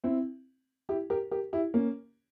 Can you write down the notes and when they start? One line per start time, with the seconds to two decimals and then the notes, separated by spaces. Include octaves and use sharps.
0.04 C4 E4
0.89 E4 G4
1.10 G4 A#4
1.31 G4 A#4
1.53 E4 G4
1.74 A#3 C#4